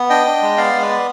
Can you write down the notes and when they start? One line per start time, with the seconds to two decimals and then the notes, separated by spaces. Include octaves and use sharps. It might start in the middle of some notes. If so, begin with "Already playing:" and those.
Already playing: B3
0.10 D4 D#5 G5
0.26 D4
0.42 G#3
0.57 B3 D5 F5
0.73 G#3
0.82 B4 D5
0.90 B3